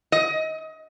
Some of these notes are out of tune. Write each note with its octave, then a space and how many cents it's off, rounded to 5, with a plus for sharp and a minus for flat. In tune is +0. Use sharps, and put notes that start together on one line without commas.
D#5 +25